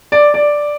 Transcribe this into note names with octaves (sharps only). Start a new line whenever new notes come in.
D5
D5